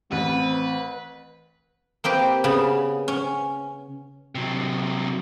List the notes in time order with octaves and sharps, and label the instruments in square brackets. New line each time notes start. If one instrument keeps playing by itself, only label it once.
[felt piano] A1 [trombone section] C4 [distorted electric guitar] B4
[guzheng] A#3 C4 G4 B4
C#3 B3 B5
C#4
[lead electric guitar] C3 F#3